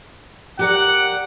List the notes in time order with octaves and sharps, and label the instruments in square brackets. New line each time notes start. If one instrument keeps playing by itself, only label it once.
[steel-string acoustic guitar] G4 A#4 D5 [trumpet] F#5